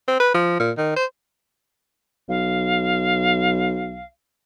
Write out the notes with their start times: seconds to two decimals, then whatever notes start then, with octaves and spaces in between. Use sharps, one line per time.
0.08 C4
0.20 B4
0.34 F3
0.60 A#2
0.77 D#3
0.97 C5
2.29 B1 F5